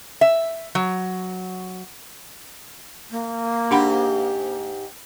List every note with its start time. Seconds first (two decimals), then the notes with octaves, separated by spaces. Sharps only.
0.21 E5
0.75 F#3
3.11 A#3
3.71 G#2 D4 G4 F#5 B5